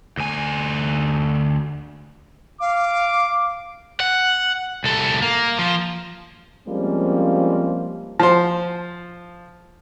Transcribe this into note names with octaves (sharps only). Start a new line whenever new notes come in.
D2 G#5
F5 D6
F#5
C2 A4
A#3
F3
F3 G3 G#3 A#3 C4 C#4
F3 C5